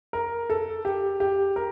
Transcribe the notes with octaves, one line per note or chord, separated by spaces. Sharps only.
A#4
A4
G4
G4
A#4